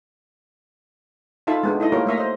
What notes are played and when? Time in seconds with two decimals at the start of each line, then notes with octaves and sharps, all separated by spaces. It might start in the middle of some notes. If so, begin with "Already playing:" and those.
1.47 D#4 F4 A4 E5 A5 B5
1.63 G#3 B3 D4
1.80 D#4 E4 A4 D#5
1.92 A#3 F4 G4 A#4 C#5
2.06 A3 A#3 E5 A#5
2.18 C5 D#5